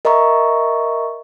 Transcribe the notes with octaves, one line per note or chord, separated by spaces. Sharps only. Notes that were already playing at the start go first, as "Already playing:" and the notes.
A#4 D#5 E5 A#5 C#6